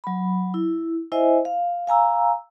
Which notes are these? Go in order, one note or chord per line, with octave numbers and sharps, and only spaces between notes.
F#3 B5
E4
E4 C5 D#5 E5 G#5
F5
F5 G#5 A#5 E6